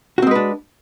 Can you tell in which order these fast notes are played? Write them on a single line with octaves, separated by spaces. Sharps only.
F#4 C4 G#3 B4 D4